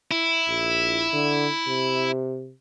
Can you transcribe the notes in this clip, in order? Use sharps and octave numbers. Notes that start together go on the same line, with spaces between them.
E4
A#1
D3
C3